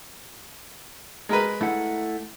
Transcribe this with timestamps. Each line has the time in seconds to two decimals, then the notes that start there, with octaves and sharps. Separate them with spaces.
1.29 G#3 A#4 B4
1.61 A3 E4 F#5